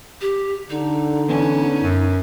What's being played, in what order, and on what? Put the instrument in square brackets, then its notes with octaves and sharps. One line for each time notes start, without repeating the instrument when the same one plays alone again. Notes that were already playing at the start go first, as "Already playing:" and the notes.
[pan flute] G4
[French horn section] D3 [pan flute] D#4
[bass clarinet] E3 [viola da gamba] B3 C#4
[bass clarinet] F#2